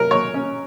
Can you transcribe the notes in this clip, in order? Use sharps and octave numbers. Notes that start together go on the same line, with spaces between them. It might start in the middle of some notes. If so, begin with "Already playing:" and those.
Already playing: F#3 A#4
F#3 C#5
C#4